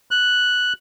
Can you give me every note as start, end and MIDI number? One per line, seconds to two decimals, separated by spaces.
0.11 0.73 90